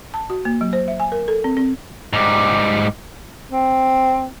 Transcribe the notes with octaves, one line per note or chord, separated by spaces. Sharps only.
A5
F#4
A#3
F#3
C5
E5
G#5
A#4
A4
C4
C4
G#2 G3
C4